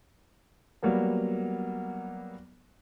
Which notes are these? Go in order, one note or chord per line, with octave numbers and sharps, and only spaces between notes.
F#3 G3 A#3 B3